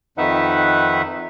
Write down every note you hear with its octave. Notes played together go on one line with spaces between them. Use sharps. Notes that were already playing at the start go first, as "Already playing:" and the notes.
F2 D#3 D#4 B4 E5 F#5